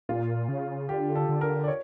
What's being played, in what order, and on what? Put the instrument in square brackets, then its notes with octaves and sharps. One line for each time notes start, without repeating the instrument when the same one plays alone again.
[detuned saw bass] A#2 [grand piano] F4
[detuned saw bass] C#3
[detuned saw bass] D3 [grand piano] G4
[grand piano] A4
[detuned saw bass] D3
[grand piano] A#4
D5
C#5